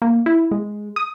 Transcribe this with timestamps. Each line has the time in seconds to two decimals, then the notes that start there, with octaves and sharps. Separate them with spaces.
0.02 A#3
0.26 E4
0.51 G#3
0.96 D#6